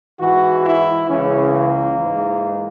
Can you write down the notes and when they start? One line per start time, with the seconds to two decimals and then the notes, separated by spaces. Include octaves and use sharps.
0.19 G#2 E3 F#4
0.65 E4
1.08 C#2 C#3 E3 C#4
1.54 A#3
1.98 E3
2.03 G#2